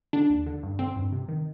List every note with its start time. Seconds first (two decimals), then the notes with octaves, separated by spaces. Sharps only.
0.13 D3 D4
0.30 D#2
0.46 D3
0.63 G2
0.79 D3 C4
0.96 G2
1.12 C3
1.29 D#3